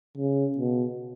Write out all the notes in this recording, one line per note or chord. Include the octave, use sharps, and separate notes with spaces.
C#3
B2